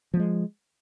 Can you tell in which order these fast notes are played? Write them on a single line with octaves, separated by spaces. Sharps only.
F3 A3 G#3